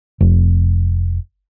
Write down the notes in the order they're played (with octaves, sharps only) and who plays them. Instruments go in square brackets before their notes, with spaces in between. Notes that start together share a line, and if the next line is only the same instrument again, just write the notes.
[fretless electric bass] F1